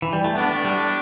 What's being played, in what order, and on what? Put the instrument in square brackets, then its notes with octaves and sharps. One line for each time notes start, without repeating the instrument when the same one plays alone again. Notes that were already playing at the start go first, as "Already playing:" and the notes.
[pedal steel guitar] E3
G3
A3
[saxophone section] A2 A3 D4 [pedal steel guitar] B3
[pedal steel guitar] G3